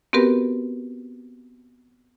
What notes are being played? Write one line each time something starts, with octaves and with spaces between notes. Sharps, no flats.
B3 C4 F#4 G4 A#4 B4